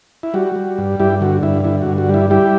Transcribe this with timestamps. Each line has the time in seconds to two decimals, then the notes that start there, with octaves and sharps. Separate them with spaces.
0.23 E4
0.34 G3 F#4
0.56 G3
0.78 G2
0.99 G2 E4 G4
1.21 D3 F#4
1.43 G2 E4
1.64 D3 E4
1.82 G2 F#4
1.98 F#4
2.09 G3 E4
2.30 G3 E4 G4